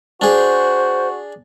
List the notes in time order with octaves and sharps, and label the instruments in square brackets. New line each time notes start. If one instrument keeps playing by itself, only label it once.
[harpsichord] D4 G#4 [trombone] F#4 [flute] C5